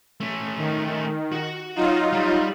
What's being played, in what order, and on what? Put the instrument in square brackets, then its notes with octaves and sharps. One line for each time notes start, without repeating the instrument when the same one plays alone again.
[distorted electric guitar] A3 C#4
[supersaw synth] D#3
[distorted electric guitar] F#4 F#5
[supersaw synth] F#3 D#4 F4
[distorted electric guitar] G3